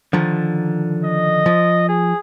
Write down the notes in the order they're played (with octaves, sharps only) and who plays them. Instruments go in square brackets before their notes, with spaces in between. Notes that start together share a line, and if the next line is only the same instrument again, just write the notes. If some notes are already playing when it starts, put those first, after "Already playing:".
[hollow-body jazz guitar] D3 D#3 F3
[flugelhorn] D#5
[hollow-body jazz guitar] F3
[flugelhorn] G#4